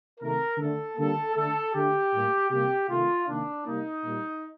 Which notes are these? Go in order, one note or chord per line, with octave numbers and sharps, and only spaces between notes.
C3 D#3 A3 A#4
D3 A3 A4
D3 G3 A#3 A4
D3 A3 A4
D3 A3 G4
A2 G3 A#3
C3 G3 A#3 G4
C3 D#3 A3 F4
C3 D#3 A#3 D4
C3 G3 A#3 D#4
A#2 G3 A#3